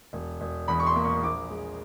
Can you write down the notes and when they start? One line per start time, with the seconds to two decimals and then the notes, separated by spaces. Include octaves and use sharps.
0.13 E1
0.41 E1
0.68 E2 B5
0.80 C#6
0.87 C6
0.96 A#3
1.05 C#6
1.23 A#1 D6
1.50 G#3